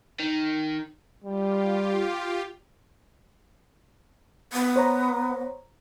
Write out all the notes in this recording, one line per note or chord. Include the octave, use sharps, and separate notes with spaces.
D#3
G3 F4 G4
B3
C5 C#5 A#5